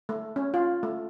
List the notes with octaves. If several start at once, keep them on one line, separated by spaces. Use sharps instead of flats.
A3
C#4
F4
A3